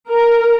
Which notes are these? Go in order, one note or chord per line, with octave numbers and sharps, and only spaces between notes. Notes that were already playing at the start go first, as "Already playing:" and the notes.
A#4